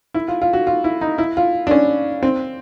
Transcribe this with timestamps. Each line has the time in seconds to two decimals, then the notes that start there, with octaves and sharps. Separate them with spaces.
0.14 E4
0.28 F4
0.42 F4
0.53 F#4
0.67 F4
0.84 E4
1.01 D#4
1.18 E4
1.37 F4
1.67 D4
1.71 C#4
2.23 C4